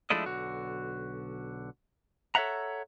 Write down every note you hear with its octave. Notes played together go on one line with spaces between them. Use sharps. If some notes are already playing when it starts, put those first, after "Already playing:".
F3 G#3 A3 D4 E4 D#5
B1 D3 F#4
A4 C#5 D#5 E5 F#5 A#5